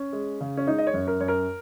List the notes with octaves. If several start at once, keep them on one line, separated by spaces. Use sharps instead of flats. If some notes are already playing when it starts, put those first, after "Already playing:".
Already playing: C#4
G#3
C#3
C#4
G#3 D#4
D#5
C#5
F#2
A#4
F#2 C#5
A#4